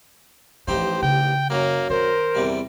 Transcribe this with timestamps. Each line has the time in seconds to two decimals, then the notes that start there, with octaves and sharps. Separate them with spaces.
0.68 A1 E3 F3 D#4 G4 C5
1.02 C#3 G5
1.50 F#2 F#3 A#3
1.90 D#3 A#4 C5
2.35 E2 C3 G3